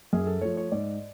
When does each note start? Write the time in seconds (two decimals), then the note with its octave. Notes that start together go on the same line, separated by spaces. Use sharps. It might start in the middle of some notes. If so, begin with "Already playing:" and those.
0.13 F#2 G#4
0.27 A4
0.41 F3 A3 C#5
0.57 C#5
0.72 G#2 D5